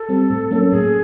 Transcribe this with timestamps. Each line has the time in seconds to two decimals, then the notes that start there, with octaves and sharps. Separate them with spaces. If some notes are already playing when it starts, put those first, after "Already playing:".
Already playing: A4
0.09 G3 C4
0.30 A2
0.51 F#3 A#3 C#4
0.72 A2 G#4